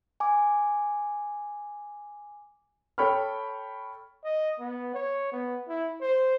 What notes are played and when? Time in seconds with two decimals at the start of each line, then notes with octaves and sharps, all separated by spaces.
0.20 G#5 D6
2.98 A4 C#5 G5 B5 C#6 F6
4.24 D#5
4.60 B3
4.94 C#5
5.32 B3
5.68 E4
6.01 C5